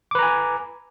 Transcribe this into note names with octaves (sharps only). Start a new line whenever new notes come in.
B4 G#5 A#5 D6